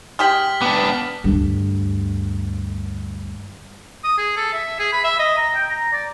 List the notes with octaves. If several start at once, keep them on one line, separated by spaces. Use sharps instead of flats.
G#3 G4 G5 F6 B6 F#7
B3 D4 D6
D2 G2
D#6
G#4
A4
E5
G#4
B5
E5
D#5
A#5
G5
A#5
D5